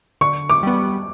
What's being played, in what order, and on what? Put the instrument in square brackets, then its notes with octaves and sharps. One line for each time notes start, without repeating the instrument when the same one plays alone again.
[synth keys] D3 [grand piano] C#6
[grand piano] D6
[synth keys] G3 B3